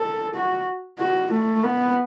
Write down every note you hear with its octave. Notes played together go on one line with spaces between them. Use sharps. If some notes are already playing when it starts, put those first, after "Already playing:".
Already playing: A4
F#4
F#4
A3
B3